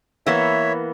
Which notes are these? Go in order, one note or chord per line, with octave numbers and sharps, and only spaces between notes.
E3 A#3 B3 C#5 E5